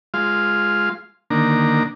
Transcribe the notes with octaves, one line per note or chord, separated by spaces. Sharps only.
G#3 F4 F5 C6
D3 D#3 A#3 D4 A#5